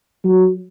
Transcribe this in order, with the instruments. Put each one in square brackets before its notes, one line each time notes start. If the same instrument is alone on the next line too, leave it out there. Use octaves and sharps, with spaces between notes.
[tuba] F#3